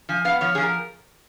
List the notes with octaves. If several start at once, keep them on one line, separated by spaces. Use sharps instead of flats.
F3 G#5
B3 F5
F3 C#5
G#4
F3
A#4